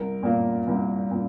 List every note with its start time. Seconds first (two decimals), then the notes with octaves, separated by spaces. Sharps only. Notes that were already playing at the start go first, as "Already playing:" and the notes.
Already playing: C2 A#4
0.23 A#2 A#3
0.68 C2
1.11 A#2